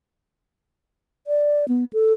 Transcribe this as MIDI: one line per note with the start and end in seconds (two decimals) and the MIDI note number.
1.27 1.65 74
1.68 1.84 59
1.93 2.13 69